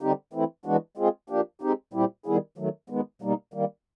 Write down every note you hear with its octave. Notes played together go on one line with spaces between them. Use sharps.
D3 G3 C4 D#4 G4
E3 A3 C4 E4
E3 G#3 B3 D4 F#4
G#3 C4 F4 G#4
F3 A#3 D4 G4
G#3 C4 D#4 G4
A#2 G3 C4 E4 G4
D#3 G3 B3 E4 G#4
D#3 F#3 A3
D#3 G#3 B3
B2 G3 A#3 D#4
D#3 G3 A#3